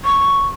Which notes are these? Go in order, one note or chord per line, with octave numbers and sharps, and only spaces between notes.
C#6